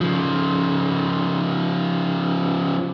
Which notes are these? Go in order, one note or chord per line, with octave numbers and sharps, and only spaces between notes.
C#3 F3